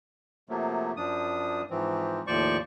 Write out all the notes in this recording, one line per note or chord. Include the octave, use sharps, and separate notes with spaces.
C3 F3 F#3 A3 A#3
F#2 F3 D4 D#6
G#2 E3 F3 C4
D#2 A2 F3 C5 D5 C#6